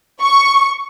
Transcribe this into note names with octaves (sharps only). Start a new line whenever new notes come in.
C#6